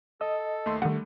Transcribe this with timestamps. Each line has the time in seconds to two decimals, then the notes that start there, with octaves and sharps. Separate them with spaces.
0.21 A4 D#5 E6
0.66 D#2 A3 C6
0.82 D3 D#3 G3 A3 F#5